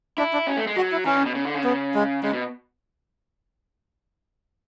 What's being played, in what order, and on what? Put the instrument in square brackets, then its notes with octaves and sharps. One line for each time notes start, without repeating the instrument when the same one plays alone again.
[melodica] D4 [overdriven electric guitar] E4
[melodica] D4
[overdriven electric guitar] C#4
A3
G#3
[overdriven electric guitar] F#3 [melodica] F#4
[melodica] E4
[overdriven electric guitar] E3 [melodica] C#4
[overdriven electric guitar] C#3
B2
C#3
D3
C#3
[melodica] B3
G#3
[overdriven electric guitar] C#3 [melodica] G#3
[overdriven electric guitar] B2